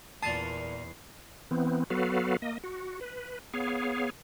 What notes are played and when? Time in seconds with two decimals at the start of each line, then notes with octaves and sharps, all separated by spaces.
0.23 E2 A#2 A5 D#6 C7
1.51 E3 B3 C4
1.90 F#3 B3 F#4 A4 B4 F5
2.42 A#3 D#5
2.64 F#4
3.01 B4
3.54 B3 G#4 C#5 F5